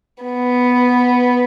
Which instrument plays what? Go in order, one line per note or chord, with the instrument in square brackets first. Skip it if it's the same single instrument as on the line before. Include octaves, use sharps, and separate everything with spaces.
[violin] B3